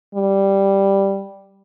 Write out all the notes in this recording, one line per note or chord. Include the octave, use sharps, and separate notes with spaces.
G3